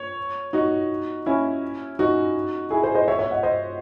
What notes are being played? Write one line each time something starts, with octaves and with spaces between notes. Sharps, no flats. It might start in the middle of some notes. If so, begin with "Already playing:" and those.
Already playing: C#5
D#4 F#4
C#4 E4
D#4 F#4
E4 G#4
G#4 C5
C5 D#5
C#5 E5
C#5 E5
D#5 F#5
C5 D#5